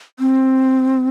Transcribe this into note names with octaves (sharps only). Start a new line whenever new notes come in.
C4